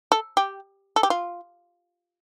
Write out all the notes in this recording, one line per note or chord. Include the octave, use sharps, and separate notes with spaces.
A4
G4
A4
G4
F4